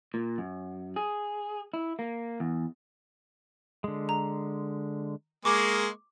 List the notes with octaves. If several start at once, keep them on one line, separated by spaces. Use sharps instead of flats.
A#2
F#2
G#4
E4
A#3
E2
D3 G#3
A#5
G#3 A#3 G#4 C#6 D6